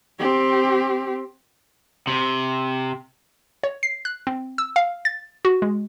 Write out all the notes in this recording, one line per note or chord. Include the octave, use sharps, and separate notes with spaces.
C4 G4
C3
C#5
C7
F#6
C4
E6
F5
A6
F#4
G#3